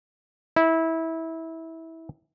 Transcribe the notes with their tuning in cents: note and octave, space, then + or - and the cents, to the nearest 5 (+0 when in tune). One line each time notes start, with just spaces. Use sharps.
E4 -20